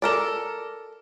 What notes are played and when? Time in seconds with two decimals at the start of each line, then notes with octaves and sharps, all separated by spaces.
0.02 A4 A#4 D5